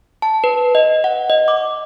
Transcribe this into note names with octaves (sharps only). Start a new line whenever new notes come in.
A5
B4
D#5
F#5
D#5
D6